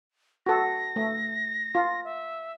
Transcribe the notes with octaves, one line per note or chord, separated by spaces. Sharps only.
F#4 A4 A#6
A3
F4
E5